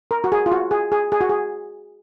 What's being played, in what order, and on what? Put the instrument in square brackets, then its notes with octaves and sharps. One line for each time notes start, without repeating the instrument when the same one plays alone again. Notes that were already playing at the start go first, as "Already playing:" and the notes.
[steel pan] A#4
F#4
G#4
F4
F#4
G#4
G#4
G#4
F#4
G#4